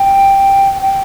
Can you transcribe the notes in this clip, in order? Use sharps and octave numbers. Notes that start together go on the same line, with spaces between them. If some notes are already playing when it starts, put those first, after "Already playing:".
Already playing: G5
G5